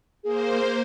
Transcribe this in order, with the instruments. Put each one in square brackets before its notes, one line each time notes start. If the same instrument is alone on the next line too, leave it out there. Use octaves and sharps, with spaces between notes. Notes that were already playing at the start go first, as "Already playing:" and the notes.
[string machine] A#3 C5 [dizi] G#4